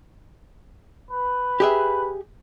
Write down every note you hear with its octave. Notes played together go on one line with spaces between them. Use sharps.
B4
G4 G#4 E5